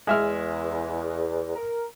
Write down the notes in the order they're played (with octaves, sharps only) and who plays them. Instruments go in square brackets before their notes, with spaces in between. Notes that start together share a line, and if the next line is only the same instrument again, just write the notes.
[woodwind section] E2 [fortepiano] G#3 E5 F6
[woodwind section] A#4